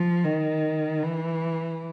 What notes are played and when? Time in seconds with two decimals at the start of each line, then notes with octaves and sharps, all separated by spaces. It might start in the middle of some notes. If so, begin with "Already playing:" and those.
Already playing: F3
0.24 D#3
1.03 E3